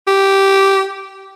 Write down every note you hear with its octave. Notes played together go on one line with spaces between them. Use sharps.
G4